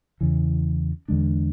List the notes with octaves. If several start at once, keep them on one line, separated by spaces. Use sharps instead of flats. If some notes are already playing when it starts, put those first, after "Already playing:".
E2 C#3 E3
E2 D3 G#3 D4